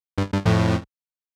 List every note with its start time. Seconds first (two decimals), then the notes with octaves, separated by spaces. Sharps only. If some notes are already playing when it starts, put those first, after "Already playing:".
0.18 G2
0.32 G2
0.46 F2 A2